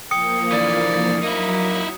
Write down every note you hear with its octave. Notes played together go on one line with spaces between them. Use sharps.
F3 A#3 G5 D#6 C#7
D3 E3 D5
F#3 A#3 D#4 E4